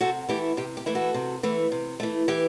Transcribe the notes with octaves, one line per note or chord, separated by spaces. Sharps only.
C3 F#4 A4
E3 A3 E4 G4
C3 G4
G4
E3 A3 E4
F#4 A4
C3
E3 A3
C3
E3 A3
E3 G4